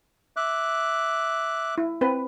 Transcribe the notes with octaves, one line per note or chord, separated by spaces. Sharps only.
E5 D6 F#6
E4
C4 B4